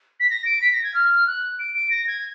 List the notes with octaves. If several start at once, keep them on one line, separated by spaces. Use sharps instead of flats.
B6
A#6
D7
B6
A#6
G#6
F6
F#6
D7
D7
A#6
G#6